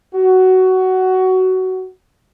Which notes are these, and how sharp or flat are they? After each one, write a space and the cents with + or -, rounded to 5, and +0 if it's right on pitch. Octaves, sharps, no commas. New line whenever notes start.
F#4 +15